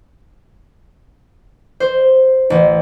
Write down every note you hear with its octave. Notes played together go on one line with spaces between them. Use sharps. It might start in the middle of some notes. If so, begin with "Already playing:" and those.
C5
A1